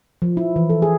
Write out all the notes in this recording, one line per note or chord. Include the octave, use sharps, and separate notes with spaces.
F3
E4
E3
A4
G#4